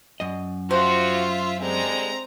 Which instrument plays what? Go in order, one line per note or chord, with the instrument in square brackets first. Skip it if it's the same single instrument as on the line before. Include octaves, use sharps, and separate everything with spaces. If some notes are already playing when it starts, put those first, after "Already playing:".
[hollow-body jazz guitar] F#2 D#5
[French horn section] F3 F#4 [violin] F4 E5 [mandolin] C5
[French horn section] D3 G3 G#3 [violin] C4 A#5